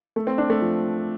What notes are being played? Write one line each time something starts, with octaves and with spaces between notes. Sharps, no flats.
A3
C4
D4
A3
F3